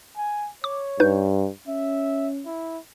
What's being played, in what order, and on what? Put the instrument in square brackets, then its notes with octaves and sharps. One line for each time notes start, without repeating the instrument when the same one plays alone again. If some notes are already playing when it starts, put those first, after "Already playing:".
[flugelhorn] G#5
[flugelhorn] C#5 [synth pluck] D6
[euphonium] G2 [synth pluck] D#4 B4 G6
[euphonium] C#4 [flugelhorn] E5
[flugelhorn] E4